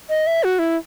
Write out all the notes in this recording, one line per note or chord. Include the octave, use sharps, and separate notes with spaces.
D#5
E5
F#4
E4